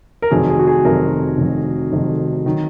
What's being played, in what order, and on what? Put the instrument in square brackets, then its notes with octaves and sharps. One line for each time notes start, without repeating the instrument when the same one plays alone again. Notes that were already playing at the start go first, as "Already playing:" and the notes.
[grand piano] A#4
F1 F2 D#3 F#3 G#4
G#4
F#4
G#4
F1 F2 D#3 F#3 A#4
F1 F2 D#3 F#3
F1 F2 D#3 F#3
D#3 F#3